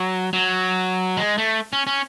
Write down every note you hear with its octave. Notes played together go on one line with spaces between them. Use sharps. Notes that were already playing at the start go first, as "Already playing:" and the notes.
Already playing: F#3
F#3
G#3
A3
C#4
C#4